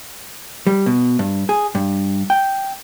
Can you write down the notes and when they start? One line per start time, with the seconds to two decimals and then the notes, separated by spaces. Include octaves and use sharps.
0.67 G3
0.86 B2
1.19 G2
1.49 G#4
1.75 G2
2.30 G5